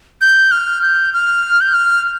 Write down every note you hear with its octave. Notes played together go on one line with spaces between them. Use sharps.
G6
F6
G6
F6
G6
F6